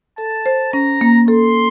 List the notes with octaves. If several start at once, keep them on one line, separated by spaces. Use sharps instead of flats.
A4 A5
C5
C#4 A#5
A#3
A4 C6